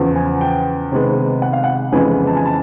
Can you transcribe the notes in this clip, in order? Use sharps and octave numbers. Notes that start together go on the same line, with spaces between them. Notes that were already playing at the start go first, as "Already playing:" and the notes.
Already playing: E2 C#3 F3
G#5
G5
C3 D#3 G#3 B3
F#5
F5
F#5
F2 C#3 E3 G#3 B3 G#5
A5
G#5
A5